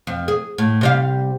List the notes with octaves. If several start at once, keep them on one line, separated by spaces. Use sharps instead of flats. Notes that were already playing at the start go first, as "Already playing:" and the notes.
F2
G#4
A2
C3 G3 F5